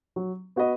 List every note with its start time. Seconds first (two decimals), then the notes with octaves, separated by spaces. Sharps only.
0.16 F#3
0.56 B3 F#4 B4 D#5